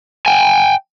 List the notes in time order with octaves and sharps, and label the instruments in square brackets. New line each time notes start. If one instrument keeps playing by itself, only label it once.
[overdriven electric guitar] G5 G#5